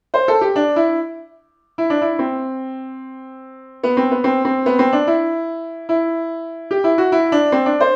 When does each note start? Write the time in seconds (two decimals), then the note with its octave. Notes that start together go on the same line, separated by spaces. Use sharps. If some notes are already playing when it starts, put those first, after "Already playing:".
0.14 C5
0.28 A4
0.41 G4
0.56 D4
0.76 E4
1.78 E4
1.90 D4
2.01 E4
2.19 C4
3.83 B3
3.97 C4
4.11 B3
4.24 C4
4.45 C4
4.66 B3
4.79 C4
4.93 D4
5.07 E4
5.89 E4
6.71 G4
6.84 E4
6.98 F#4
7.12 E4
7.32 D4
7.52 C4
7.66 D4
7.80 C5